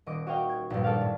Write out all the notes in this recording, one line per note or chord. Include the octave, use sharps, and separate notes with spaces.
D#1 D#5 D6
F#4 C#5 D#5 F5 G5
G#6
A#1 G2
A4 D5 F5
A2